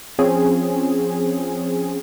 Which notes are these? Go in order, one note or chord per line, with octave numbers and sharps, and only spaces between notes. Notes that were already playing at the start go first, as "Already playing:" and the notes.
F3 C4 C#4 G#4